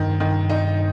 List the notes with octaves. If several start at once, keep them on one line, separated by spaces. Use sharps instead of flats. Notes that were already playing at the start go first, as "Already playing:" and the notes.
Already playing: G2 D#3
D#3
D#4